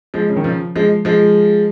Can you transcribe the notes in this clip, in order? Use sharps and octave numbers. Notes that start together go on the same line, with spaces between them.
F3 G#3
C#3
D#3
C#3 F3
F3 G#3
F3 G#3